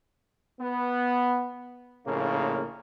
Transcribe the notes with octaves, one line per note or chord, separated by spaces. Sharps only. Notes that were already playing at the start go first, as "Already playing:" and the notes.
B3
A#1 A2 C#3 A#3